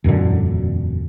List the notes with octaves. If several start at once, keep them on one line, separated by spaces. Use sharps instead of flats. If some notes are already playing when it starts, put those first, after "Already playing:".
E1 F#2 A#2 D3